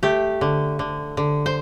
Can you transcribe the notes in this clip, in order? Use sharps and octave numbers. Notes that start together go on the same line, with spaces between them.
A3 G4
D3
D3
D3
C5